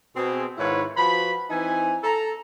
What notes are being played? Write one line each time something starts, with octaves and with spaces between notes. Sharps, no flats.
B2 C4 G#4
G#2 D#3 E4 F4 B4 C#5
F3 F#4 B4 B5
E3 C4 D#4 G#5
A4 A#5